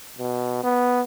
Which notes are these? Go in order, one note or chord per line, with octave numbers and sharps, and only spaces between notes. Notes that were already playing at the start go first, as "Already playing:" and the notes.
B2
B3